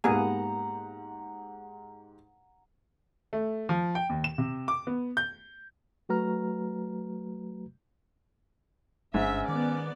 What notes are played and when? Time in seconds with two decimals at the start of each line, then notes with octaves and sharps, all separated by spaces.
0.04 G#2 A#3 B3 G4 G#4 F#5 A#5
3.33 A3
3.69 F3
3.95 G5
4.09 D#2
4.24 E7
4.38 C3
4.68 D6
4.87 B3
5.17 G6
6.09 F#3 A3 F#4 B4 A#5 F6
9.14 G1 G#2 C#4 D4 E5
9.48 D#3 B3 D5